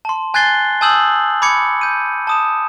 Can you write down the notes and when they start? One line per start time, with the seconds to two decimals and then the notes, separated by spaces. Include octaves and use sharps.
0.05 A5 C6
0.34 G#5 F#6 G#6 A6 C7 G7
0.81 G#5 A5 D#6 E6 G6 F#7
1.42 B5 D6 G#6 C#7
1.81 G6 D#7
2.27 A5 D#6 E7